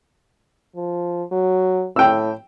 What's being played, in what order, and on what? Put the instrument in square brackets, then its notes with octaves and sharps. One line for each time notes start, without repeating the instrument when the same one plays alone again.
[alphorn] F3
F#3
[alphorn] A2 [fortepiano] G5 E6